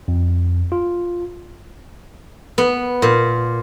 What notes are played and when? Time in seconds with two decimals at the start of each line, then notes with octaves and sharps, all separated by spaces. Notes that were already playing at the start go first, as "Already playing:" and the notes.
0.08 F2
0.72 F4
2.58 B3
3.02 A#2